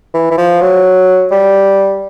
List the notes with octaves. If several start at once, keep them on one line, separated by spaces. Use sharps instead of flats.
E3
E3
F3
F#3
G3